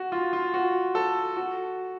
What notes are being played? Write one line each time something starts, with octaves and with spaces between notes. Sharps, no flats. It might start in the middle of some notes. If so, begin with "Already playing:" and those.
Already playing: F#4
F4
F4
F#4
A4
F#4